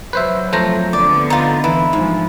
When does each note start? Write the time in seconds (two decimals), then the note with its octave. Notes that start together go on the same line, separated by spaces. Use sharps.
0.13 F#3 B4 C5 E5
0.53 F2 A3 C5 A#5
0.93 D3 B3 D5
1.30 D#4 F4
1.64 E3 E4
1.93 G#2 F3